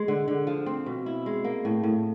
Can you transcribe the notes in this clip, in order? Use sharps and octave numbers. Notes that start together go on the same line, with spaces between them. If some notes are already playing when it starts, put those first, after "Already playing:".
Already playing: G#3
D3
D3
F3
C4
B2
E4
G#3
A#3
A2
A2